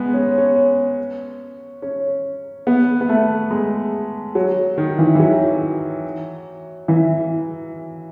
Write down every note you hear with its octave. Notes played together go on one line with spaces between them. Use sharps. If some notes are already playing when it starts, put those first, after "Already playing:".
Already playing: G#3 B3
C#4
C#4
C#4
B3
B3
A3
G#3
F#3
D#3
E3
E3
F#3
E3